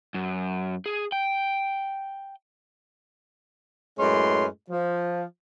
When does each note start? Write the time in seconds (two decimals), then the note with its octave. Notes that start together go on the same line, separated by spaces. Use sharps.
0.14 F#2
0.86 G#4
1.12 G5
3.99 F#2 A2 G#3 C#4 B4 C6
4.70 F3